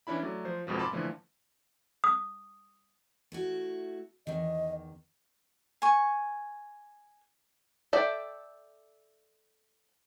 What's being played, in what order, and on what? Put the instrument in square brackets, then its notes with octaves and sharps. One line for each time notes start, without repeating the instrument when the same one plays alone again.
[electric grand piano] E3 C#4 D4 E4 B5
F#3 A3 D5
F3 C5
G#1 F2 G#2 B2 F3
A5 B5 C6 D6
A#2 D3 E3 F3 A3
[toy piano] D#6
[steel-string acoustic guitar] A3 E4 F#4
[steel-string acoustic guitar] E2 D#3 [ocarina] D#5
[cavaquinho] G#5 C#6
[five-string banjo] A4 D5 E5 G5